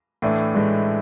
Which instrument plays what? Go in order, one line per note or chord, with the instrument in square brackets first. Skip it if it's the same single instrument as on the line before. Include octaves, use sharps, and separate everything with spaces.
[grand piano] A2 E3 A3 D4
[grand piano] A2 E3 A3 D4 [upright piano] G#3